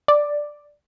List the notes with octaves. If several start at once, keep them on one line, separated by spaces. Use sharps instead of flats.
D5